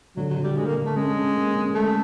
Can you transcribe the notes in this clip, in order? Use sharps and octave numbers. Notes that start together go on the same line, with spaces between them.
D3 F#3
F#3
D3
G3
D3 G#3
A#3
D3
A3
G#3 C#4
C#4
A#3
C#4
G#3 A3